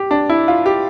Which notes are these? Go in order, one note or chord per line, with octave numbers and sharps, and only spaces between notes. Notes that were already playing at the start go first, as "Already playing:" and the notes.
Already playing: G4
D4
E4
F4
G4